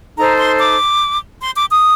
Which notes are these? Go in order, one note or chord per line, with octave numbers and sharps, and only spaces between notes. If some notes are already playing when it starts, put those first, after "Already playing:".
D#4 A4 C5 A#5
C6
D6
C6
D6
D#6